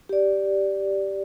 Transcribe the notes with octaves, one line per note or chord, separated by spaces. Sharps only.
G4 D5